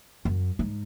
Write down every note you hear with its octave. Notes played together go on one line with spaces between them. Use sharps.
F#2
G#2